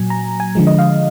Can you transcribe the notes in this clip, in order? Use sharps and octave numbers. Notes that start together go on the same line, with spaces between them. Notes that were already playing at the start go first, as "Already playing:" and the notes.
Already playing: A#2 F#3 G#5
A#5
G#5
D3 F3 G#3
D#5
F5